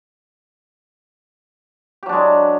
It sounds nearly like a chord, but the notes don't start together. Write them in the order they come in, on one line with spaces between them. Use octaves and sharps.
G4 F#3 D4 G#3